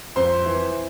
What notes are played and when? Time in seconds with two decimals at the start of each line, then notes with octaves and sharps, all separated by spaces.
0.16 F2 C5 C6
0.46 E3